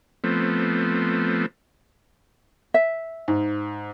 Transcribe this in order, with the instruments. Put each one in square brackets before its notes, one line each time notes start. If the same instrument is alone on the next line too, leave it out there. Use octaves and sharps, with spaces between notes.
[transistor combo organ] F3 A3 B3 C4
[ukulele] E5
[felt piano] G#2